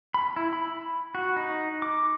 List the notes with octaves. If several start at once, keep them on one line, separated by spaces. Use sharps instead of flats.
B5
E4
B5
F#4
D#4
D6